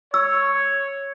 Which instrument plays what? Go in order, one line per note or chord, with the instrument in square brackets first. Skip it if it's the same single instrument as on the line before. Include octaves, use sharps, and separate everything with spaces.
[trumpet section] C#5 [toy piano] E6